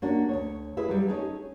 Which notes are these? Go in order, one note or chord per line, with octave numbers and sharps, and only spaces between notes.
A#3 C#4 D4 F#4
D2 G2 C#5
E4 G#4 B4 E5
F#3 G3
C#4 D#4 G#4 A4